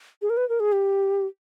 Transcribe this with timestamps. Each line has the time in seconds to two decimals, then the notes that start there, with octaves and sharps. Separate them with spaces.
0.22 G#4
0.30 A#4
0.37 B4
0.49 A#4
0.60 G#4
0.72 G4